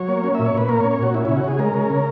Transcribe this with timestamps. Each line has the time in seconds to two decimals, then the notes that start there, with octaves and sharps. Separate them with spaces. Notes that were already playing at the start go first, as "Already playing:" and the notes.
Already playing: F#3 C#5
0.08 A#3
0.24 C#4
0.35 A#2 E5
0.46 C#5
0.54 A#2 B4
0.69 A#3 A#4
0.80 C#5
0.84 C#4
0.91 C#5
0.99 A#2 F#4
1.14 C#4 E4
1.25 C#3 E4
1.37 F#4
1.44 C#3 G#4
1.59 G#3 A#4
1.74 C#4
1.90 C#3